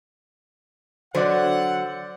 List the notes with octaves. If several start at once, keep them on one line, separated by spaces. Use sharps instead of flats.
D3 F#3 C5 D5 F#5